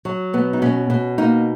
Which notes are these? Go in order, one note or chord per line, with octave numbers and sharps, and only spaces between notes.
F#3
B2 B3
D#4
B2 C#4
B2
A#3 D#4